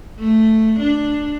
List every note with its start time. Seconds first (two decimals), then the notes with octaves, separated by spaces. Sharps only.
0.19 A3
0.79 D4